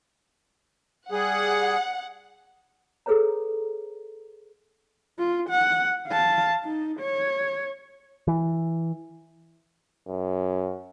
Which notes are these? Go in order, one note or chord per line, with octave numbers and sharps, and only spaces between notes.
G3 G#4 F#5
G#4 A4 B4 C#5 A#5
F4
F#5
F5 A5
D#4
C#5
E3
F#2